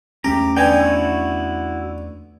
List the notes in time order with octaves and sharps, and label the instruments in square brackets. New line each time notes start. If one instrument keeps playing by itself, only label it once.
[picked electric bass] E2 A3 C#4 [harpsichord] G4 [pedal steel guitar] A#5
[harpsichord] D3 B3 [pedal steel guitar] G5 G#5
[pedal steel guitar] E4 F#4